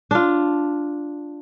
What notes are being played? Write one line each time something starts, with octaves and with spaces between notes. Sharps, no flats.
D4 F4